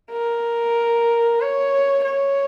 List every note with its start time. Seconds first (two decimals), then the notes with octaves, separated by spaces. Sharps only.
0.12 A#4
1.40 C#5
2.04 C#5